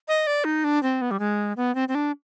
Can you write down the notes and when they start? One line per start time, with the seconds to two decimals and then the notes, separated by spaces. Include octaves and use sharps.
0.08 D#5
0.27 D5
0.44 D#4
0.64 D4
0.83 C4
1.02 B3
1.11 G3
1.19 G#3
1.57 B3
1.75 C4
1.88 C4
1.95 D4